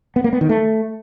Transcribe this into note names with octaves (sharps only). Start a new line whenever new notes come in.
B3
A#3
B3
D#3
A3